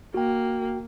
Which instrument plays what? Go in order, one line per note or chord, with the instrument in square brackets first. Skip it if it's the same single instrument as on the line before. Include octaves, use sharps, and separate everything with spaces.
[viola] A#3 [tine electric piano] F#4 G5